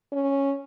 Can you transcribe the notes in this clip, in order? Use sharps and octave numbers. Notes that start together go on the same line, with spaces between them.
C#4